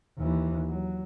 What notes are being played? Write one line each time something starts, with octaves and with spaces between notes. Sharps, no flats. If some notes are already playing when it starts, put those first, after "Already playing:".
D#2 E3
F#3